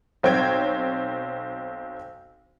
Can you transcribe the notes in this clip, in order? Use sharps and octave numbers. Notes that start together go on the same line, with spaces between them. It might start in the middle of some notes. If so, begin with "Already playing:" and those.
B1 C4 C#5 G5 G#6